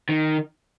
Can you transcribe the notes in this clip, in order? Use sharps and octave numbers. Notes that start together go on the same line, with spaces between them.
D#3